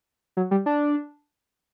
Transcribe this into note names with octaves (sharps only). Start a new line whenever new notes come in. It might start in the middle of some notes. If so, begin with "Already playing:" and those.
F#3
G3
D4